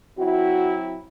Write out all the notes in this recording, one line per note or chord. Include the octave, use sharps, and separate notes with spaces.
F#3 C4 E4 F#4